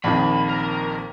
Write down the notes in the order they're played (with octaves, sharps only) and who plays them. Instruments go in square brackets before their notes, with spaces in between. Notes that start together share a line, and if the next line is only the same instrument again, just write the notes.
[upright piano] A#1 F2 D#3 [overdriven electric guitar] B5
[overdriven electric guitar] A#4